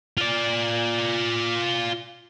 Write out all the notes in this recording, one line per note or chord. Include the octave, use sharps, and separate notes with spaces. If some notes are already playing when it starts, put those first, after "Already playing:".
F4 D5